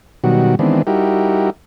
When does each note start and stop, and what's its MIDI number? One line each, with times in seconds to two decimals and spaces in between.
0.24 0.55 47
0.24 0.55 51
0.24 0.55 54
0.24 0.55 55
0.24 0.55 66
0.59 0.82 51
0.59 0.82 52
0.59 0.82 56
0.59 0.82 59
0.59 0.82 60
0.59 0.82 62
0.87 1.50 55
0.87 1.50 63
0.87 1.50 64
0.87 1.50 66
0.87 1.50 67
0.87 1.50 70